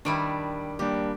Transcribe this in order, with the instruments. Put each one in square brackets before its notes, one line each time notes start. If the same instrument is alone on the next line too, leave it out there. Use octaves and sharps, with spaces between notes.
[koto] D#3 G3 E4 [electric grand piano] D4 D7
[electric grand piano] G3 A#3 D4 [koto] G4